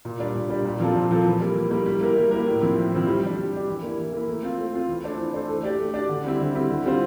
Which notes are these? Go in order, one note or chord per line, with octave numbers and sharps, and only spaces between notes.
A#2
G3 D4 G4 D5
A#2
G3 D4 G4 D5
A#2
F3 C4 F4 A4
A#2
F3 C4 F4 A4
E3
G3 A#3
E3
G3 A#3
G3
A#3 E4 A#4
G3
A#3 E4 A#4
A2
F3 C4 E4
A2
F3 C4 E4
G3
D4 G4
G3
D4 G4
E3
A#3 E4
E3
A#3 E4
A3
C4 F4
A3
C4 F4
E3
A3 D4 A4 C5
E3
A3 D4 A4 C5
A3
D4 G4 D5
A3
D4 G4 D5
D3
G3 C4 E4
D3
G3 C4 E4
D3
G3 C4 F4 C5